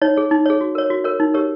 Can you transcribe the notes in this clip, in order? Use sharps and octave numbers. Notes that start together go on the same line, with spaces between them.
D#4 C#5
G#4 C#5
D#4
G#4 C#5
F#4
A#4 C#5
F#4
A#4 C#5
D#4
G4 A#4 C#5